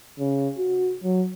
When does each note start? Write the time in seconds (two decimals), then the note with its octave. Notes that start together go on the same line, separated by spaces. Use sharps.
0.19 C#3
0.58 F#4
1.03 F#3